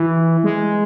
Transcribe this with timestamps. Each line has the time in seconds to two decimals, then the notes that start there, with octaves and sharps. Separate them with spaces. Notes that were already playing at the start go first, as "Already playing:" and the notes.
Already playing: E3
0.44 G#3